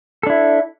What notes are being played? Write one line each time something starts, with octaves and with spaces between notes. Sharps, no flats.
D4 E4 A4